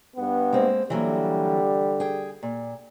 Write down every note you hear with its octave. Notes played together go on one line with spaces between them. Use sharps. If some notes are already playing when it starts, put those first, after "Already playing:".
G2 B3
G#3 A#3 C4
D3 E3 F#3 G3 A#3
G#4 G5
A#2